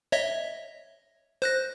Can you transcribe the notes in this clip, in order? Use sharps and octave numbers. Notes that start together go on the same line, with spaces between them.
C#5 D#5 E5
C5 F#6 A#6